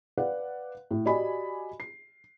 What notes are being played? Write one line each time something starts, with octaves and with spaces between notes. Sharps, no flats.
B4 D5 F5 F#5
A2
F#4 G4 D5 D#5 G#5 B5
C7